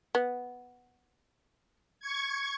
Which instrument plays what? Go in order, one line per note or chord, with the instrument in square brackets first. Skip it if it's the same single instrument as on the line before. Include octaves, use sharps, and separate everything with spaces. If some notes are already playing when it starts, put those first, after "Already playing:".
[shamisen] B3
[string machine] C#6 G#6